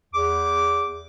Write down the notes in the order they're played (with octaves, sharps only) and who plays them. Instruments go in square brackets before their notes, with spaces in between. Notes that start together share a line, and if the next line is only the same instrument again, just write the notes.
[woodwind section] E2 D6